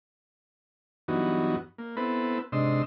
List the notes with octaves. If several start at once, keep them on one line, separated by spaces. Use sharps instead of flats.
G2 E3 F#3 B3 D#4 F#4
A#3
B3 C4 E4 A4 B4
G#2 C3 D4 D#5 C6 E6